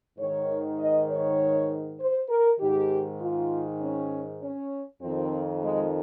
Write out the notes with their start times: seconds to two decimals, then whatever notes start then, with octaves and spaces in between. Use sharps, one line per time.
0.18 G#2 D#3 C#5
0.79 D#5
1.09 C#5
2.00 C5
2.29 A#4
2.60 G#2 D#3 G4
3.21 F4
3.80 C#4
4.41 C#4
5.01 F2 D#3 C4
5.63 G#3